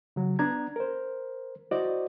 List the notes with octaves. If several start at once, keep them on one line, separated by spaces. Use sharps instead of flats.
C#3 F#3
B3 D4 A#5 G#6
A#4 C5
E4 F#4 C5 D5 D#5